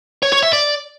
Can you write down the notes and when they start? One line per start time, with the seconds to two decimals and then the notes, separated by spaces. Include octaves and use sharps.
0.23 C#5
0.33 C#5
0.43 E5
0.53 D5